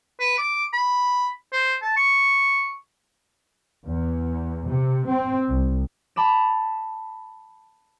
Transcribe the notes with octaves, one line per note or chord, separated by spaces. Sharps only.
B4
D6
B5
C5
A5
C#6
E2
C3
C4
C2
A5 B5 D6 E7